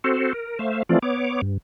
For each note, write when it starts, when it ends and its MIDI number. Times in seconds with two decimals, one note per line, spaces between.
0.04 0.33 60
0.04 0.33 66
0.04 0.33 69
0.04 0.33 72
0.34 0.59 70
0.59 0.83 57
0.59 0.83 72
0.59 0.83 76
0.59 0.83 77
0.89 0.99 52
0.89 0.99 53
0.89 0.99 57
0.89 0.99 60
0.89 0.99 65
0.89 0.99 74
1.02 1.41 59
1.02 1.41 73
1.02 1.41 86
1.42 1.58 43